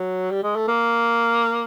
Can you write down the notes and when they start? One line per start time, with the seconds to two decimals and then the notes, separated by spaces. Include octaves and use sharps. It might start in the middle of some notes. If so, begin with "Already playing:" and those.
Already playing: F#3
0.31 G3
0.43 G#3
0.56 A3
0.68 A#3